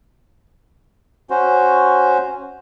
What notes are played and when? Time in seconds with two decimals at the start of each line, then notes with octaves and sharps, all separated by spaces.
1.30 C#4 F#4 C5